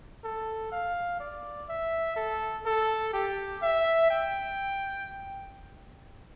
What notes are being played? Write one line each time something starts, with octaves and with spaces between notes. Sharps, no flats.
A4
F5
D5
E5
A4
A4
G4
E5
G5